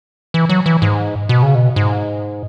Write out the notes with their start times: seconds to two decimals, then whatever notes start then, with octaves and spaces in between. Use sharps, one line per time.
0.34 E3
0.49 F#3
0.66 E3
0.82 G#2
1.29 B2
1.43 C#3
1.55 B2
1.76 G#2